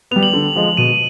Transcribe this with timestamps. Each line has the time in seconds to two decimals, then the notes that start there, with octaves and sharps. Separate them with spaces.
0.11 B3 F7
0.16 G3
0.23 F#7
0.33 D3
0.56 F3 G#3
0.77 B2 D#7